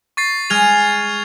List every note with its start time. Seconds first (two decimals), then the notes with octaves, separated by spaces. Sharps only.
0.17 C#6 A6 C7
0.50 G#3 F6 G#6 F7